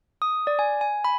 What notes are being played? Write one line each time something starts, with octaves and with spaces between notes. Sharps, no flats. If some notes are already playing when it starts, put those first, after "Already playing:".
D#6
D5
G#5
G#5
B5